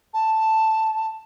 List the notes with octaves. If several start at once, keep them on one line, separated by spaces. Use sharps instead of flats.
A5